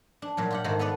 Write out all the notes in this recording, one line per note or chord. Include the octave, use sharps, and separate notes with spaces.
D4
A#2 F#3 G3
F4 G4 F#5
G#2 D#3 F#4 A4 C5 F5
B3 A4 B4 D5